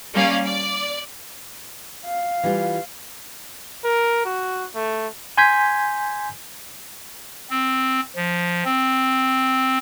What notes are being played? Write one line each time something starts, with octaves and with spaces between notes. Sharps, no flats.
G3 A#3 C#4 D5 F5
D5
F5
E3 G3 F4
A#4
F#4
A3
G#5 C6 G6 G#6 B6
C4
F3
C4